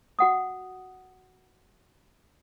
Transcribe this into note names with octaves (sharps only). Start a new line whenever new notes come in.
F#4 F#5 D#6